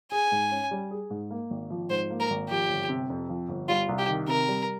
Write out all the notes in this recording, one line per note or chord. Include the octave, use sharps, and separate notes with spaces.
G#4 G#5
G#2
C#4
G3
G#4
G#2
A#3
G#1
F3
G#2 C5
A#3
A#4
G#1
F3 G4
G1
C3
F2
F3
G1
G3 F4
C2
G4
D#3
C3 A#4
G3